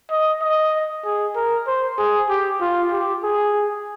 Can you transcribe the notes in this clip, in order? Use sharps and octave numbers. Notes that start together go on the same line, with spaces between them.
D#5
D#5
G#4
A#4
C5
G#4
G4
F4
G4
G#4